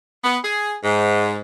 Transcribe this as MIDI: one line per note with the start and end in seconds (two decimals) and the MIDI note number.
0.24 0.37 59
0.44 0.74 68
0.83 1.41 44